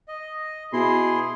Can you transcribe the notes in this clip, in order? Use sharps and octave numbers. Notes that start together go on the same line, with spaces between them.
D#5
B2 E4 G#4 C6